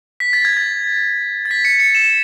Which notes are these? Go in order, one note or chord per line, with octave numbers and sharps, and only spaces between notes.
B6
A6
G#6
A6
A6
B6
C#7
C#7
E7